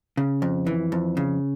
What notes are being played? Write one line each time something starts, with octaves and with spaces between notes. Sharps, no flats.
C#3
F2
E3
F2
C#3